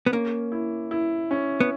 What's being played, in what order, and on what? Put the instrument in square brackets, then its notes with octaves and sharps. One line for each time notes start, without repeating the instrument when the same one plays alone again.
[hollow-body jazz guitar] B3
[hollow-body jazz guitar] A#3 [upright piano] C#4
[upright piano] E4
E4
C#4
[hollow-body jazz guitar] B3